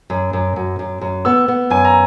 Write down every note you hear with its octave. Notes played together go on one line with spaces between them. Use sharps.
F#2
F#2
F#2
F#2
F#2
B3 E6
B3
F#2 G#5
A#5